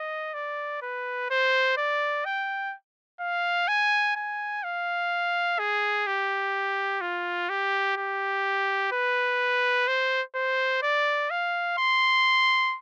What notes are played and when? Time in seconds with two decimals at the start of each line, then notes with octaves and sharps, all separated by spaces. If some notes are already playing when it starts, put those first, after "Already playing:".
Already playing: D#5
0.34 D5
0.82 B4
1.30 C5
1.77 D5
2.25 G5
3.20 F5
3.68 G#5
4.16 G#5
4.63 F5
5.59 G#4
6.07 G4
7.01 F4
7.49 G4
7.96 G4
8.92 B4
9.87 C5
10.35 C5
10.82 D5
11.30 F5
11.78 C6